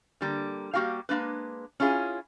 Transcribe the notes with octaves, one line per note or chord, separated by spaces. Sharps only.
D3 G3 A#3
G3 A#3 F#4 G4 F5
G#3 A#3 D4 B4
C#4 E4 F4 G#4